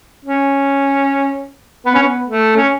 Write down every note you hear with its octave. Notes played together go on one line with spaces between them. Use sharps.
C#4
B3
C#4
B3
A3
C#4